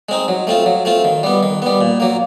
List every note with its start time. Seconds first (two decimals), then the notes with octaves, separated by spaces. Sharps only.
0.09 G#3 C4 D#4
0.28 F#3
0.47 A3 C4 F4
0.66 F#3
0.85 A3 C4 F4
1.04 D#3
1.23 G3 B3
1.43 D#3
1.62 G3 B3
1.81 A#2
2.00 F#3 A#3